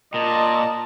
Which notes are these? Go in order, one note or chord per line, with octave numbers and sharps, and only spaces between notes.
A#2 D#5 A5